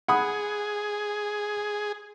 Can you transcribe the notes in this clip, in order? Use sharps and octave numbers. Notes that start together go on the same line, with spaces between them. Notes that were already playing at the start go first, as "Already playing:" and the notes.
G#4 F#5 B5 D#6